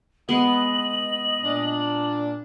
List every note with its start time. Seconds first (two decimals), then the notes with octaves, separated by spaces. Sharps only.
0.29 G#3 B3 D#5 F#7
1.43 A#2 D4